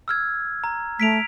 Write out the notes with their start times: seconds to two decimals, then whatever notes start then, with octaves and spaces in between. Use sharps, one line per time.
0.08 E6 F6 G#6
0.64 A#5
1.00 A3 B6 D7 F7